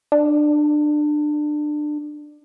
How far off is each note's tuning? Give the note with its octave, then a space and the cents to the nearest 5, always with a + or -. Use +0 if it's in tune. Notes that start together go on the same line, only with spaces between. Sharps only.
D4 +25